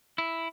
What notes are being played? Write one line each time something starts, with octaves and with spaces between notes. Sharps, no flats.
E4